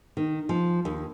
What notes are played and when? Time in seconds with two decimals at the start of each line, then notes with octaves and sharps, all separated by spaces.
0.17 D#3
0.49 F3
0.85 D#2